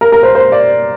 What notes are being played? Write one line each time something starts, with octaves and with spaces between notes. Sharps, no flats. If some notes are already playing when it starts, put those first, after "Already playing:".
A#4
A#4
C5
C5
D5